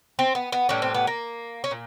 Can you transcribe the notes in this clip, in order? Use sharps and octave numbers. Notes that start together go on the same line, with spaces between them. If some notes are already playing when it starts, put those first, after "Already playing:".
C4
B3
B3
A2 E3 G3 C#4
C4
B3
A#3
C#4
A#2